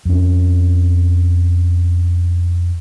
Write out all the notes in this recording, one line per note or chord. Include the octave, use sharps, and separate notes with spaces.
F2 C#4